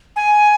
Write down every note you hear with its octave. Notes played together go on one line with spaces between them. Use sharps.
G#5